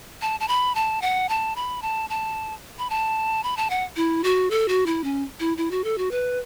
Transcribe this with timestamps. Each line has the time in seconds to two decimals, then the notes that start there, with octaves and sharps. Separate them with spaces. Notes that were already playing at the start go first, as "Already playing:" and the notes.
0.22 A5
0.40 A5
0.48 B5
0.75 A5
1.02 F#5
1.29 A5
1.56 B5
1.82 A5
2.10 A5
2.79 B5
2.90 A5
3.43 B5
3.57 A5
3.70 F#5
3.96 E4
4.24 F#4
4.50 A4
4.68 F#4
4.86 E4
5.04 C#4
5.40 E4
5.57 E4
5.71 F#4
5.84 A4
5.98 F#4
6.11 B4